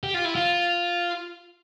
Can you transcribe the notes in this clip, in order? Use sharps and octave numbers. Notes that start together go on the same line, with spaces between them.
G4
F4
E4
F4